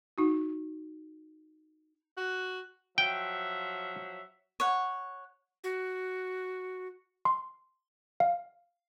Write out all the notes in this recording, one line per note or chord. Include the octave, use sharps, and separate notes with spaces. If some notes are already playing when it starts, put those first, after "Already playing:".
D#4 F#4
F#4
F3 F#3 E5 G5
C#5 F#5
F#4
C6
F5